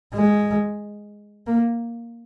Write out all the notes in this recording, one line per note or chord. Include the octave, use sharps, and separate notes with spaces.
G#3
A#3